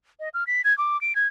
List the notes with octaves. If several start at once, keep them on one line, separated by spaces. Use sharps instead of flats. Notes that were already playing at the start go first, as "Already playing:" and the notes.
D#5
F6
B6
G#6
D6
D7
G#6